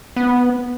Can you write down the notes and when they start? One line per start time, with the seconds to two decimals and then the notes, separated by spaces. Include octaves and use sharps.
0.16 B3